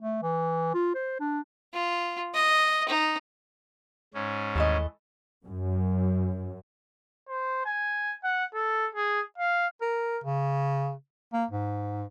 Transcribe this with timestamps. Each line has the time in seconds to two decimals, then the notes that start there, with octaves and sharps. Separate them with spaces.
0.01 A3
0.23 E3
0.74 F4
0.95 C5
1.20 D4
1.73 F4
2.34 D#5
2.88 D#4
4.14 G#2 C#4
4.56 D#2 E3 A3 D#5
5.44 F#2
7.28 C5
7.65 G#5
8.24 F#5
8.54 A4
8.95 G#4
9.38 F5
9.81 A#4
10.24 C#3
11.33 A#3
11.51 G#2